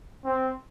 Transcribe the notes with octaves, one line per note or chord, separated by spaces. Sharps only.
C4